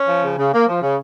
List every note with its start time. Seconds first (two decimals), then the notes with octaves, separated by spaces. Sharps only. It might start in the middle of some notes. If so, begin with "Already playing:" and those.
Already playing: C#4
0.08 F3
0.23 C#3
0.38 C#3
0.53 A#3
0.68 F3
0.82 C#3